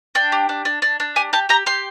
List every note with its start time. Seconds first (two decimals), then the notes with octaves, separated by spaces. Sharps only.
0.15 D4 G5
0.32 G4
0.49 D4
0.65 D4
0.82 D4
1.00 D4
1.16 G4 G#5
1.33 G4 A5
1.49 G4 A#5
1.66 G4 C6